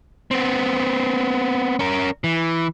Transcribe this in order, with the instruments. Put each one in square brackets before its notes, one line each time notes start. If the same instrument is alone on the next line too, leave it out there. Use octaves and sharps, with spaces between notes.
[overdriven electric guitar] B3 C4
C#4 A#4
E3